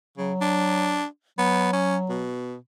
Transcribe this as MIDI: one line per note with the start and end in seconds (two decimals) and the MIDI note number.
0.18 0.32 49
0.18 1.02 54
0.41 1.06 62
1.38 2.31 54
1.38 1.73 59
1.73 1.96 61
2.09 2.56 47